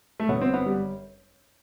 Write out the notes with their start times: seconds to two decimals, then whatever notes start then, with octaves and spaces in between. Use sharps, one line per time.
0.20 A3
0.29 G1 F#2 F#3 B3
0.42 C4
0.54 B3
0.66 G3